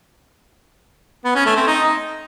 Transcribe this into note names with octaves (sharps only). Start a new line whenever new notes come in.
B3
C#4
A3
C4
D#4